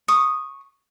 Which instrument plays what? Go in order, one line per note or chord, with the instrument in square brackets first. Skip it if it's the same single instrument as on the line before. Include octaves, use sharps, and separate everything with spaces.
[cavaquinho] C#6 D#6